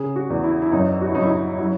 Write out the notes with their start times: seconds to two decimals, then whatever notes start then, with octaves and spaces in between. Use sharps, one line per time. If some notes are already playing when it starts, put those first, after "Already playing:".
Already playing: C#3 G#4
0.16 F#4
0.30 E2
0.44 E4
0.62 E4
0.72 F#2 D#4
1.01 F#4
1.08 E4
1.15 F#2 D#4
1.23 E4
1.30 D#4
1.58 F#3 E4